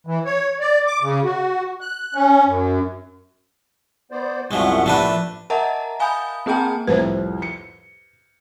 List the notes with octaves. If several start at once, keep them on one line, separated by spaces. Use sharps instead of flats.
E3
C#5
D5
D6
C#3
F#4
F#6
C#4
F#2
B3 C5 D5
C2 F#2 F3 G3 G#3 E5 F#5 C#6
A2 F3 A3 D4 B4
A#4 D#5 E5 F#5 A5 A#5
F5 G#5 B5 D#6 G6
A#3 C4 G#4 G5 A5 A#5
C2 F2 A2 B4 C5
C#7